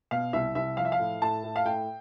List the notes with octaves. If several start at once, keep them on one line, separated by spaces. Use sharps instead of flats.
B2 F5
C2 E5
C2 E5
F3 F5
E5
F5
A2
A2 A5
A2
F5
A2 G5